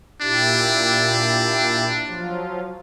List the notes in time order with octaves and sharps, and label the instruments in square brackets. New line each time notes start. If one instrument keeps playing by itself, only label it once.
[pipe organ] A#2 E4 G4 [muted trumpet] D4
[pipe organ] F3 F#3 F4